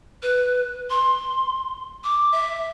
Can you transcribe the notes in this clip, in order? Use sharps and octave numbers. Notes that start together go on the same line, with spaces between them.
B4
C6
D6
E5